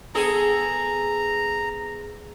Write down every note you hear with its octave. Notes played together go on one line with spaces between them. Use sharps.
B3 G#4 A4 A#5